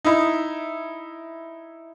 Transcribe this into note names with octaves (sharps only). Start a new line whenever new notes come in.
D#4 E4